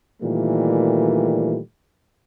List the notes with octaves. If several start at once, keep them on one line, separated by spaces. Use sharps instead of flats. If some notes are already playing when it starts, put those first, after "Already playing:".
A#2 D#3 E3 G3 A3